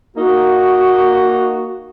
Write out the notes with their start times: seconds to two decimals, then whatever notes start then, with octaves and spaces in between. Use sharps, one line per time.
0.17 A#3 D#4 F#4